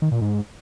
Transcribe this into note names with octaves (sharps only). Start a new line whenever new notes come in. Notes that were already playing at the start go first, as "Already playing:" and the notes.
D#3
A#2
G#2